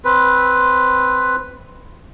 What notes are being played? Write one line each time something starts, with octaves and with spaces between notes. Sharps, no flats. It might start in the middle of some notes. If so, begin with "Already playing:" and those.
C4 B4